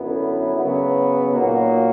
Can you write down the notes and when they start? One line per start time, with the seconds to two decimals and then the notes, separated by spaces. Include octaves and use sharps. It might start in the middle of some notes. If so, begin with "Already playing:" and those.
Already playing: F#2 D3 F#3 B3 E4
0.55 C#3 F#3 B3
1.32 A#2 F#3 A#3 D#4 F#4